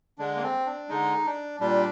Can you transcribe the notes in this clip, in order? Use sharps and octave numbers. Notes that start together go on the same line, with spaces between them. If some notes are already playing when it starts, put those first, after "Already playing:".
D3 G#3 D4
A#3
C4
D4
D3 G#3 D#4
D4
A#2 G3 D4